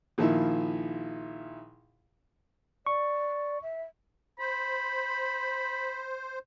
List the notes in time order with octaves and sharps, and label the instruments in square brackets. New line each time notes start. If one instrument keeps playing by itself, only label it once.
[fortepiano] A#1 D#3 F3 E4 E5
[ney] D5 [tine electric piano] C#6
[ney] E5
[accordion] C5 [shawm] B5